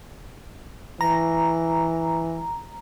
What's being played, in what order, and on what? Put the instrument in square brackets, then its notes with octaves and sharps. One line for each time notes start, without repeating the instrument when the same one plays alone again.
[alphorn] E3 [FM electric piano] A#5